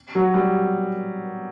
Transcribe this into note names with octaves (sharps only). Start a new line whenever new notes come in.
F#3
G3